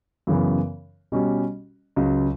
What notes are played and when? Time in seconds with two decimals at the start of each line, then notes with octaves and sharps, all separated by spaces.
0.27 F#2 C#3 E3 B3
1.12 B2 G3 C#4 F#4
1.96 C#2 C#3 F#3